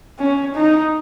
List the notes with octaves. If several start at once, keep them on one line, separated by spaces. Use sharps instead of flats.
C#4
D#4